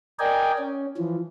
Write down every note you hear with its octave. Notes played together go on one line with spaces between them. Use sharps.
A#4 D5 D#5 G5 G#5
C#4
E3 F3